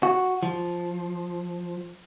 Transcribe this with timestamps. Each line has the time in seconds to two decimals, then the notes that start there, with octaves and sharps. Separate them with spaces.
0.03 F#4
0.43 F3